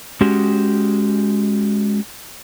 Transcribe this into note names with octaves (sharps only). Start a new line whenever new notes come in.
G#3 C#4 F#4 G4